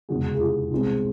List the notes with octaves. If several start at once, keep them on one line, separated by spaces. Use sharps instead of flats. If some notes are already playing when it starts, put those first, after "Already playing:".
F1 E2 C#3 E3 G#3 F#4 G#4
G#4
F4 G4
C2 B2 G#3 C4